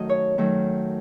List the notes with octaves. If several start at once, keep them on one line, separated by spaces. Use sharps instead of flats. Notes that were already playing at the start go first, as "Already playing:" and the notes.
Already playing: F#2 D#3 F#3 A3 D#5
C#5
F#2 D#3 F#3 A3